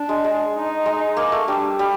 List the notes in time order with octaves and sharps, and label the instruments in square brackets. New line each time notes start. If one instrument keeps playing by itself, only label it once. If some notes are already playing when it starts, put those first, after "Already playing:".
Already playing: [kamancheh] D4
[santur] G#3
G#3
[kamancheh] D#4
[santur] G#3
A#3
A3
[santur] G3 [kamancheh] D4
[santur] G3